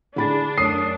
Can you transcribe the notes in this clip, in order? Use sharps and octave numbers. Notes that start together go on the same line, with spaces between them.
D3 D4 E4 G4 G#4 B5 A6
F#2 A3 A4 D#6 C7